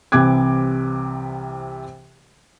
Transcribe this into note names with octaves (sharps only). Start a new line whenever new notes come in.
C2 C3 E3 D6 F#6 G#6